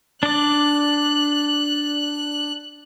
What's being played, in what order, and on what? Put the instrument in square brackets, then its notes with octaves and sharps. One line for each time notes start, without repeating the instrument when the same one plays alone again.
[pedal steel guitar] D4 D5 [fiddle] F#6